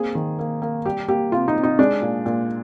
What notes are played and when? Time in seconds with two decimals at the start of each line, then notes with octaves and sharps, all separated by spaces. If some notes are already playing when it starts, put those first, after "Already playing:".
Already playing: A#3 C4 G#4
0.15 D#3
0.39 A#3
0.62 A#3
0.85 G3 G4
1.08 A#3 G4
1.32 C3 F4
1.48 D#4
1.56 C3
1.63 D#4
1.79 G#3 D4
2.02 A#2
2.25 A#2